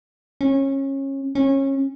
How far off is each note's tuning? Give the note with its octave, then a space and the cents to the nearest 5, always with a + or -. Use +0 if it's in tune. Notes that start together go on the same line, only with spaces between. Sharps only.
C#4 -25
C#4 -25